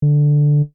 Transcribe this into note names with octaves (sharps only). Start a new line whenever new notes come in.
D3